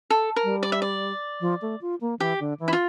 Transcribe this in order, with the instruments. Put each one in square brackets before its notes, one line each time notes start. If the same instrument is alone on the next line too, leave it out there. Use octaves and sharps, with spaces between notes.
[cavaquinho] A4
A#4
[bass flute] G3
[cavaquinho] D5
E5
D5
[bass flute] F3
A3
F4
A#3
[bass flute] E3 [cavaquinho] G4
[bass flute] D3
E3
[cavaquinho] E4
F4